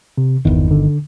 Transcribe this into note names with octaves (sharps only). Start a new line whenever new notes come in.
C3
G1 E2 D#3
D3